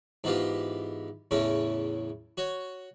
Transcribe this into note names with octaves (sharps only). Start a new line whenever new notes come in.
G#2 E3 B3 F4 G4
E2 A2 C#3 E3 C#4
F#4 C#5